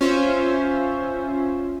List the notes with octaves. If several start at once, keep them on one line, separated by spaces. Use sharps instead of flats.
C#4 F4 C5 E5